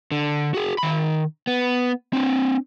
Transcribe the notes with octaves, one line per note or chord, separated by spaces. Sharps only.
D3
F#4 G#4
D#3 B5
B3
C4 D4